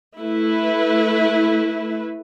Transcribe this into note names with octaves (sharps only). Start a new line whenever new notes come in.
A3 E4 B4